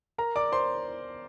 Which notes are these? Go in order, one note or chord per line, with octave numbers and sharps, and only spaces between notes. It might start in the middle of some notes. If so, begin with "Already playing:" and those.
A#4 A#5
D5 D6
C5 C6